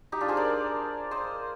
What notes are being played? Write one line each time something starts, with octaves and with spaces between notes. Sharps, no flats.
D#4 G4
D4 F4
G#4 C5
A#4 D5
C5 D#5